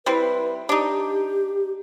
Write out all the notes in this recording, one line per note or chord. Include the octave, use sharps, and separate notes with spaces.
G3 C4 E4 B4
D4 D#4 G4